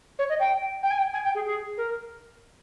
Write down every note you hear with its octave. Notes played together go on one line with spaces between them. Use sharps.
C#5
D#5
G5
G5
G#5
G5
G#5
G5
G#4
G#4
A#4